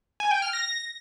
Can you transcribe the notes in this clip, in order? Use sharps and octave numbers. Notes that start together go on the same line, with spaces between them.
G#5
G5
F6
A#6